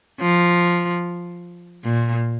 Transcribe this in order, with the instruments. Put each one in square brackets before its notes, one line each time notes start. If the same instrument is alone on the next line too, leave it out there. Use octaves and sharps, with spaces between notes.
[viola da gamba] F3
A#2